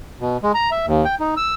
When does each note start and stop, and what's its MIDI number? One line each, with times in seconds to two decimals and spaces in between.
0.20 0.37 47
0.43 0.52 56
0.54 0.70 82
0.71 0.86 76
0.87 1.05 39
1.05 1.15 79
1.20 1.34 63
1.37 1.54 88